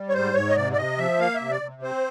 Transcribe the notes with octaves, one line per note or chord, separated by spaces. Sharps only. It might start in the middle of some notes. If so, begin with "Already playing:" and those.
Already playing: G3
C#5
G#2 C5
G#2 C#5
D#5
C3 D5
D5
C3 D#5
F3 E5
A#3 F5
E5
C3
D5
C3
C4 C5